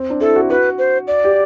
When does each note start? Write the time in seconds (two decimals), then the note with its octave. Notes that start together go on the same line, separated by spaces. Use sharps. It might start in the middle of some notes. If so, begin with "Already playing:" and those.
Already playing: C4
0.10 D4
0.20 E4 A4
0.36 F#4
0.49 F#4 B4
0.78 C5
1.07 D5
1.24 G4